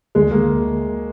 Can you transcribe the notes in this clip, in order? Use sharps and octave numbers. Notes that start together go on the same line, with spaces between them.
D2 G#3
D2 A#3